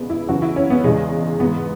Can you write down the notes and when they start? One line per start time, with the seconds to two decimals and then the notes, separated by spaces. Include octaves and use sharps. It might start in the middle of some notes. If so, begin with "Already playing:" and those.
Already playing: E2 C#3 E3 G#3 B3
0.10 E4
0.29 F#2 C#3 E3 F#4
0.42 E4
0.56 C#4
0.70 B3
0.84 E2 C#3 E3 G#3
1.40 G#2 E3 B3